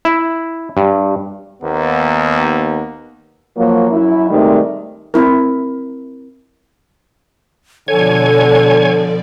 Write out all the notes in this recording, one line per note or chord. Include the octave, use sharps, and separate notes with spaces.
E4
G2
D#2 B3
F3 F#3 A#3
F#2 E4
G#2 C3 D#3 G3 A3
C4 E4 A#4
B2 D3 F3 A4 C#5 D5 G#5